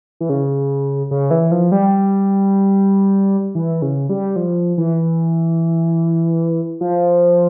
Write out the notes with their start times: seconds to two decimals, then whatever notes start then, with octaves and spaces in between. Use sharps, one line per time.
0.21 E3
0.29 C#3
1.11 C#3
1.31 E3
1.51 F3
1.72 G3
3.55 E3
3.82 C#3
4.09 G3
4.36 F3
4.78 E3
6.81 F3